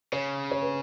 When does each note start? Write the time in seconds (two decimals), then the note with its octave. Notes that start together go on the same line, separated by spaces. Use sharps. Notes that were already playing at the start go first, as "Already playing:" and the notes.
0.12 C#3 C#5
0.51 C#5
0.62 B4